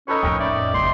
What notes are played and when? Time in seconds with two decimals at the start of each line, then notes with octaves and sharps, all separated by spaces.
0.08 C#4 D#4 A4 B4 C#5
0.23 F2 A2 A#4 G5
0.39 D5 E5
0.74 F#1 C6